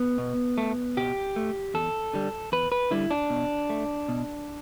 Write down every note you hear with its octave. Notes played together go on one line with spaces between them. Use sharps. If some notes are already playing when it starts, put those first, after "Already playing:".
Already playing: B3
B2
A3
B2 G4
A3
E2 A4
D3 G3
E2 B4
B4
D3 G3 E4
D4
B2
A3
B2